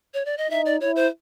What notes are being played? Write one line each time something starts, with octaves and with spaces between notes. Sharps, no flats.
C#5
D5
D#5
D#4 E5
D5
E4 C#5
C5